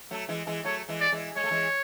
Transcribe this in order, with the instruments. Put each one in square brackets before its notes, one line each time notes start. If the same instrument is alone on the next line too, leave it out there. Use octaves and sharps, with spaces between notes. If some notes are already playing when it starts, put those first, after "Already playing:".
[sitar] F#3 A3
E3 G#3
E3 G#3
[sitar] F#3 A3 [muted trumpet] C#5
[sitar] E3 G#3
[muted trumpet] D5
[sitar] E3 G#3
[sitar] G#3 [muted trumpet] C#5
[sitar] A3
E3 G#3